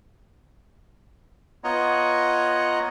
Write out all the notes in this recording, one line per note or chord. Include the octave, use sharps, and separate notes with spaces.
B3 F4 C#5 D#5 F#5 A#5